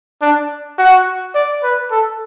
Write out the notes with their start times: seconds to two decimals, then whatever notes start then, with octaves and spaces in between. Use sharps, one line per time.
0.22 D4
0.78 F#4
1.35 D5
1.63 B4
1.91 A4